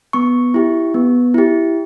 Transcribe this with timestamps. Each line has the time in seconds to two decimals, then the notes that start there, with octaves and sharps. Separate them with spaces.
0.13 B3 C#6
0.54 E4 G4
0.94 B3
1.34 E4 G4